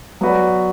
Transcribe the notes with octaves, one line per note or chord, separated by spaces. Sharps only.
F#3 B3 F#4 B4 D5